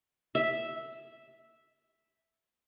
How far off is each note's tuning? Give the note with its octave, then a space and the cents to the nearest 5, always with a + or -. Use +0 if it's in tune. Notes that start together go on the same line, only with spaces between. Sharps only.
E5 -5